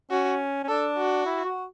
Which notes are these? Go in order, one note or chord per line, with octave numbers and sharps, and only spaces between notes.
C#4 F#4
C#4
D4 A4
F#4
E4
F#4